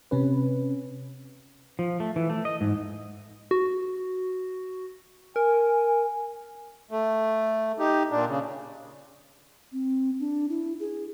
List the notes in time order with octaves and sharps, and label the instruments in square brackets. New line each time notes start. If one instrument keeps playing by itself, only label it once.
[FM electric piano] C3 C#4 B4
[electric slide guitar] F3
A3
E3
A3
D#5
G#2
[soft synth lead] F#4
[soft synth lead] A#4 [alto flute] G#5
[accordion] A3
D#4 G4
A#2 D4
C#3
[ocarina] C4
D4
E4
G#4